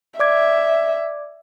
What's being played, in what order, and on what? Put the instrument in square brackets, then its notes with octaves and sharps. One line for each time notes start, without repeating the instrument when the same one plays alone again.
[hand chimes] D5 D6 G#6 [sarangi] E5